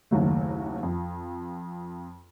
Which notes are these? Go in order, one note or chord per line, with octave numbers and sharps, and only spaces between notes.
F#1 D#2 F#3 A3
F2